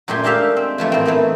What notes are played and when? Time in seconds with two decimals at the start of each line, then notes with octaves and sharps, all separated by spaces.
0.08 F#2 A#2 A3 G4 G#5 C6
0.24 G#3 D4 D#4 G4 E5 F5
0.57 C4
0.78 E3 F3 A3 A#3
0.92 A2 C4
1.05 E3 A3 B3 D#4